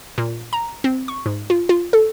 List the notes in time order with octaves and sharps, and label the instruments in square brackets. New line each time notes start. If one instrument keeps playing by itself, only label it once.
[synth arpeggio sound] A#2
A#5
C4
C#6
G#2
F4
F4
A4